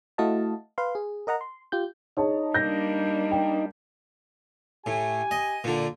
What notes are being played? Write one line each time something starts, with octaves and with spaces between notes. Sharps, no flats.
A3 E4 F#4 D#5 F5 A5
B4 F5 C6
G#4
A#4 D#5 F#5 A#5
C6
F4 G4 G6
D#4 G#4 C#5 A5
G3 A#3 D4 G6 A#6
G5
A2 G4 G#5
D#5
A#2 D3